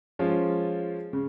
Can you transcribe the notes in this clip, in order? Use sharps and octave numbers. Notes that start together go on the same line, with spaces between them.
F3 G#3 C#4 F4
C#3